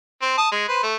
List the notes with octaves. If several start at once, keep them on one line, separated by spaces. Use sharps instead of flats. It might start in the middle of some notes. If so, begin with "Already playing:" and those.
C4
A5 D#6
G#3
B4 C5
A3